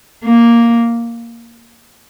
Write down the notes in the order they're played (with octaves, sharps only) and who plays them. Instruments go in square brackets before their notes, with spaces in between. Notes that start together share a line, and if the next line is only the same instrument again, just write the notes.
[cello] A#3